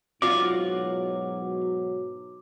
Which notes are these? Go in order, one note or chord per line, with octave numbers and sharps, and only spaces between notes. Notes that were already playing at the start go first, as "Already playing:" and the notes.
G#2 B2 F#3 F4 F#4 D5 D6